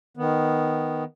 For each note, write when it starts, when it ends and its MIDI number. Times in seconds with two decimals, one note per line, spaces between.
0.17 1.04 51
0.17 1.04 59